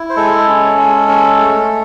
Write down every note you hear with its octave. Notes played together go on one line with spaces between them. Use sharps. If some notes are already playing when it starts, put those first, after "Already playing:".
Already playing: E4
C5
G#3 A4
C#4
G#3
C#4
A3